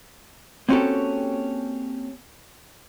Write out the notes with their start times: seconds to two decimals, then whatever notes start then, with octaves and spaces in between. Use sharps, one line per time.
0.69 A#3 C4 C#4 F#4 G4 A4